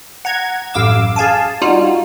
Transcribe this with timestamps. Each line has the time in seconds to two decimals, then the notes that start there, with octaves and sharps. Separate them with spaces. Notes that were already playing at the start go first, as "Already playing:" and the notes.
0.25 F#5 A#5 G#6
0.74 A1 F#2 F5 D6 E6
1.16 G#4 F5 G#5 A5
1.61 G3 D#4 F4 F#4